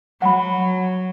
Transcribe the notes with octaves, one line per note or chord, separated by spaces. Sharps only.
F#3 F#5 B5